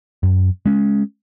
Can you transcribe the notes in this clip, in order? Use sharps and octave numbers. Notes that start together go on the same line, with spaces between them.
F#2
G#3 C#4